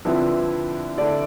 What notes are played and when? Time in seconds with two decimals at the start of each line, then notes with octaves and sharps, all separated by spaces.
0.05 D3 F3 C4 E4 B4
0.97 D3 A3 E4 D5